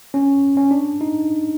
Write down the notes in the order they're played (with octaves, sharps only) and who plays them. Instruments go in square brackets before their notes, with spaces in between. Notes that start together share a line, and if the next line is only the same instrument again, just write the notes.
[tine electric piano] C#4
C#4
D4
D#4